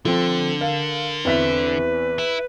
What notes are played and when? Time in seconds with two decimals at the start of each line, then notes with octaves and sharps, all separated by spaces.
0.05 D3 F3 C4 A4
0.61 A#4 F5
1.25 E2 C4 B4 E5 B6
2.19 E4